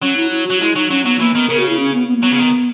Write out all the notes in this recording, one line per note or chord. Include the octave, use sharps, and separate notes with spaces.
F#3 C#4
E4
E4
F#3 F#4
G#3 E4
F#3 D#4
F#3 C#4
F#3 B3
E3 A#3
D#3 B3
C#3 A#4
F#4
E4
C#4
B3
B3
A#3
F#3 B3
C#3
D#3